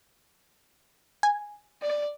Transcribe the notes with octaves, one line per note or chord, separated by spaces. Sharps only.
G#5
D5